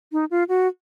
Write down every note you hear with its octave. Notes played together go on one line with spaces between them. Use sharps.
D#4
F4
F#4